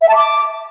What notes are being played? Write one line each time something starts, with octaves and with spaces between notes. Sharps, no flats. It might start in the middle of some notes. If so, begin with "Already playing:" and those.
E5
A5
D6